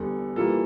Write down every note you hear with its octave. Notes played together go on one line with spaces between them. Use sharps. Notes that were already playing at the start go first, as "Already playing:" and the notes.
Already playing: E2 D3 G3
E3 G3 A#3 F4 A4